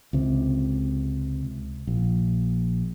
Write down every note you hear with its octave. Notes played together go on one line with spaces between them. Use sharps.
C#2 C3
A#1